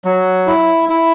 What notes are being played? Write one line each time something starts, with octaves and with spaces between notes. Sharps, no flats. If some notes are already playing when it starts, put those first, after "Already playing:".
F#3
E4
E4